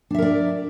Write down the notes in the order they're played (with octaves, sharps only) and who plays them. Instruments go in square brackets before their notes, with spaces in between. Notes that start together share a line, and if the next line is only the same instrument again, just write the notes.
[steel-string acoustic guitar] D4
E5
A#4
D5